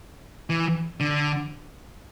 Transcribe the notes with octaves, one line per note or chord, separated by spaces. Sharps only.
E3
D3